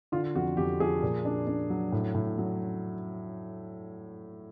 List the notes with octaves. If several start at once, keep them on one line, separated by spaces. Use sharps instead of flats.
D3 F4
F2 F#4
F2 G4
F3 G#4
A#2
D4
D4
F#3
A2
A2
F#3